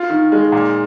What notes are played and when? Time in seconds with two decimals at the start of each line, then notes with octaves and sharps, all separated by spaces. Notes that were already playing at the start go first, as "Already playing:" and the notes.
Already playing: F4
0.09 D#3
0.32 G#3
0.52 A#2